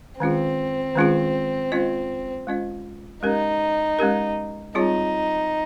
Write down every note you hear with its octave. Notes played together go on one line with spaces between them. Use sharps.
D#3 G#3 C4 C#4 F4 G#4
D#3 G#3 C#4 F4 G#4
G#3 C#4 F4 C5 D#5
G#3 C#4 F4 C5 D#5
G#3 C#4 D#4 G4 A#4
G#3 C#4 G4 A#4
G3 C4 D#4 F4 G#4 C#5